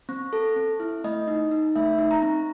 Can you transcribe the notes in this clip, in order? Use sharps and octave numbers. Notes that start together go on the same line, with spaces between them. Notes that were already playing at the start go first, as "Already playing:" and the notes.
C4
A4
C4
E4
A3 D#5
D#4
D#4
A3 E5
D#4
A#5
C4